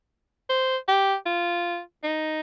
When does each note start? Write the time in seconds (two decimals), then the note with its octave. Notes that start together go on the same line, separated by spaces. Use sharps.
0.49 C5
0.88 G4
1.26 F4
2.04 D#4